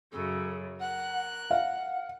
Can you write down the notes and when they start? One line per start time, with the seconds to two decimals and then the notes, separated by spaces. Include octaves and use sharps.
0.12 F#2 C#3 F#3 A4
0.79 A#4 F#5 F#6
1.51 F5 F#5